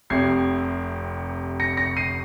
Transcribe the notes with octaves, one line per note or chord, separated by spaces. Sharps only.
F1 F2 C3 G#6 C7
A#6 C#7
A#6 C#7
C7 D#7